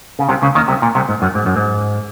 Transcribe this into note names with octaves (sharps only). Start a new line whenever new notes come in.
C#3
C2 C3
C#2 C#3
D#2 D#3
C2 C3
A#2
C2 C3
G#2
F#2
G#2
F#2
G#2